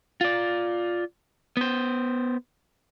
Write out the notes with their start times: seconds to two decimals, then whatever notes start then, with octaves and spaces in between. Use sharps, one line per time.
0.21 F4 D5
1.57 B3 C5